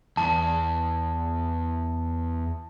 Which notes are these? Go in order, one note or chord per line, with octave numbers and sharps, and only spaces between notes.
E2 A5